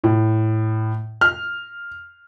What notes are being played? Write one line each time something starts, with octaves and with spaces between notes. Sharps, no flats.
A2
F6